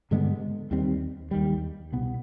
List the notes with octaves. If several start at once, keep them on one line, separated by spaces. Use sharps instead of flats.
G2 D3 G#3 B3
D#2 D#3 G3 C4
D#2 D#3 G3
C2 B2 B3